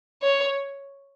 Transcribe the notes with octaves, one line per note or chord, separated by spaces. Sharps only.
C#5